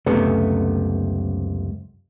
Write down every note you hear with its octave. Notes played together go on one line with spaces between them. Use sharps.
C#2 F#2 C3 A3 B3